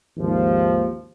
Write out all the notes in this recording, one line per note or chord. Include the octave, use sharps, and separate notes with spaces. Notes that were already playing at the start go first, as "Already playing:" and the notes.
G#1 D#2 F3